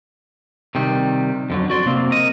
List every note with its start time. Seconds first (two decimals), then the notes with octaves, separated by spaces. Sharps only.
0.75 C3 D#3 G3
1.50 F2 D3 F#3
1.70 F#4 D5 C6
1.85 C3 A#3 C4
2.11 A#4 D#5